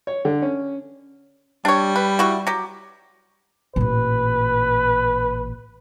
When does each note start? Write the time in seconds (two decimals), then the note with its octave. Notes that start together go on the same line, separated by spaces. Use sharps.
0.07 C#5
0.25 D3
0.42 C#4
1.65 G3 D4 C#5
1.96 B4
2.19 E4 F#4
2.47 F#3 G4
3.76 A1 A#2 B4